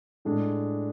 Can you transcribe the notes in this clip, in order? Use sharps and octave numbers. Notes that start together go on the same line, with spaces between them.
A2 G#3 D4